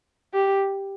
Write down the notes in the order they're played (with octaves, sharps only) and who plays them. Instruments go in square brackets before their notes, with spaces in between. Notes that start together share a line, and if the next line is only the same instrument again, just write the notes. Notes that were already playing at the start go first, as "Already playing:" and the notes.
[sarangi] G4